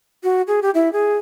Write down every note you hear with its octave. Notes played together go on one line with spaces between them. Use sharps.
F#4
G#4
G4
E4
G#4